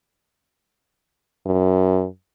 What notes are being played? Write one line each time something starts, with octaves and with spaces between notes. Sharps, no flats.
F#2